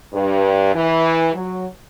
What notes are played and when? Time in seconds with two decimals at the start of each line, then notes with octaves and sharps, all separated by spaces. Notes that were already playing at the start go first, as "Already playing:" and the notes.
0.13 G2
0.73 E3
1.34 F#3